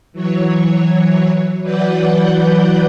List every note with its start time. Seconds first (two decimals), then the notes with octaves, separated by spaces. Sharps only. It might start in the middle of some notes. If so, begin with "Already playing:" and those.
0.12 E3 F#3 C#5
1.61 E3 F#3 B4 D5 F#5 G6